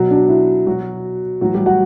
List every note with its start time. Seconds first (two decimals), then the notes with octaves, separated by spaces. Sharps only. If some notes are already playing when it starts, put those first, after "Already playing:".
Already playing: B2 F#3 F#4
0.11 D4
0.29 E4
0.66 B2 F#3 F#4
1.41 A2 E3 F#3 F#4
1.54 G3 G4
1.66 F#4 F#5